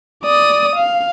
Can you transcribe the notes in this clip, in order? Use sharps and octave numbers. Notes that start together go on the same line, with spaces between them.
D5 D#6
F5